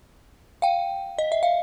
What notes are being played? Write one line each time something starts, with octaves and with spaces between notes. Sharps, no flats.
F5 G5
D#5
E5
F5